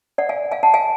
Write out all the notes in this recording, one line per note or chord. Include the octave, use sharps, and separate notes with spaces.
D5 F#5
F5 G#5
F5 G#5
F#5 A5
F5 G#5